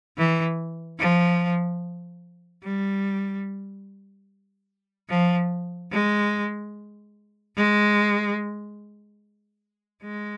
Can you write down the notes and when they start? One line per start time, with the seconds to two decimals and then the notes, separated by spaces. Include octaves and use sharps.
0.17 E3
0.99 F3
2.63 G3
5.10 F3
5.92 G#3
7.56 G#3
10.03 G#3